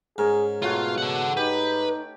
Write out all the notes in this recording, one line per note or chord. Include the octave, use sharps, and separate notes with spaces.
G#2 C#4 G#4 A#4
B2 F#3 A3 F4 F#4
A4 F#5
D#4 G4 B4